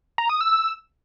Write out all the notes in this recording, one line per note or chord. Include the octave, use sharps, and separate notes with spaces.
A#5
D#6
E6